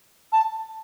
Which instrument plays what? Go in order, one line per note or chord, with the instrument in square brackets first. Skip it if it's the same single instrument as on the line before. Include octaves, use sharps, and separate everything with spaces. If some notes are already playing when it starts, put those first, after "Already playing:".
[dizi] A5